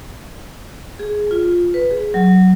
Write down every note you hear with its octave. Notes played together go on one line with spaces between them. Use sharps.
G#4
F4
B4
G#4
F#3